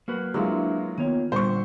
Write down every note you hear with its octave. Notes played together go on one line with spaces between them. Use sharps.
F#3 A#3 F#4 B4
F#3 G#3 D4 E4 F4 E5
D#3 A#3 B3 F4 C#5
A#2 D3 G3 C5 C#6